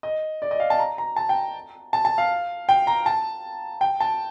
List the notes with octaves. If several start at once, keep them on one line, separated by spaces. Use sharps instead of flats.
D#5
D5
D#5
F5
A5
A#5
A#5
A5
G5
A5
A5
F5
G5
A#5
A5
G5
A5